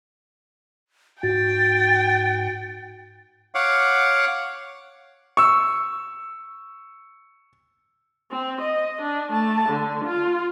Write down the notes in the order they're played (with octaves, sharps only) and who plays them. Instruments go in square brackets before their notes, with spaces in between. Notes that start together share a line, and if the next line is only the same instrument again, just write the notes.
[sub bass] G#2 [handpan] F#4 [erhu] G5 [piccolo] A6
[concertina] C#5 F5 F#5 D6
[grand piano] C#6 E6
[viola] C4
D#5
D4
A3 A5
D3
F4